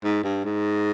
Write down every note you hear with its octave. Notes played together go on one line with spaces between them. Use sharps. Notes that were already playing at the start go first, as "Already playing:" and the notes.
G#2
G2
G#2